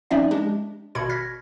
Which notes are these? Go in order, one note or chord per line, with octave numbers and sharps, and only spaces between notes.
F3 C4 C#4 D#4 D5 E5
G#3 D4 G4
G#1 B2 F#4 B5 G#6 C#7
F6 G#6 A#6 B6